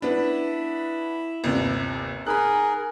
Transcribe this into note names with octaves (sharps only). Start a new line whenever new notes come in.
B3 D4 E4
G1 D#2 C3
D#4 G#4 A#4 B5 F#6